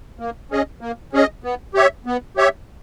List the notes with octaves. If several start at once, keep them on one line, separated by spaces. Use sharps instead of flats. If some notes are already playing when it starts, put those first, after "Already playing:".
A#3
C#4 G#4 D#5
A#3
C#4 G#4 D#5
B3
G4 C#5 E5
B3
G4 C#5 E5